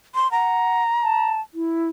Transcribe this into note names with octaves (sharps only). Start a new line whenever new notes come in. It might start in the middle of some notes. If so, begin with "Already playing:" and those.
C6
F#5 A#5
A5
E4